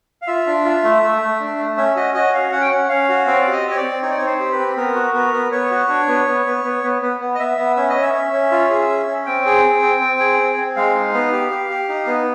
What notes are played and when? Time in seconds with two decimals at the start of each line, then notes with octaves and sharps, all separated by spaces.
0.22 F5
0.27 F4 E5
0.47 D4
0.65 F4
0.84 A3
1.03 A3
1.22 A3
1.40 D4
1.59 A3
1.77 C#4 E5
1.96 F#4 D#5
2.14 F#4 D#5
2.33 C#4 F5
2.52 C#4 F#5
2.61 G5
2.71 C#4 F#5
2.89 C#4 F5
3.09 F#4
3.27 C4 F5
3.41 D5
3.46 G4
3.52 D#5
3.64 C4
3.71 C#5
3.77 D5
3.83 C4
4.02 D#4 C#5
4.10 D5
4.18 C#5
4.21 C4
4.26 C5
4.40 G4
4.52 B4
4.58 C4
4.77 B3 A#4
4.96 F#4
5.14 B3 A#4
5.34 B3
5.51 B3 C#5
5.71 F#4
5.89 D4
6.08 B3
6.27 B3
6.46 B3
6.64 B3
6.83 B3
7.02 B3
7.20 B3
7.35 D#5
7.39 B3 E5
7.58 B3
7.76 C#4 E5
7.90 D#5
7.96 C#4
8.02 E5
8.14 C#4
8.33 C#4
8.51 F4
8.70 G#4
8.89 C#4
9.07 C#4
9.26 C4 G5
9.46 G#4
9.64 C4
9.82 C4
10.01 C4
10.20 G#4
10.39 C4
10.58 C4
10.76 G#3 F5
10.95 D#4
11.14 B3
11.32 G4
11.51 G4
11.70 G4
11.89 D#4
12.07 B3